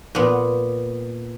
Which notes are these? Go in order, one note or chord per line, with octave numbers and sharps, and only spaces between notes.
A#2 B3